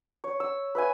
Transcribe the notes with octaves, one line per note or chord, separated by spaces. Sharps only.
C#5
E6
B4 E5 G#5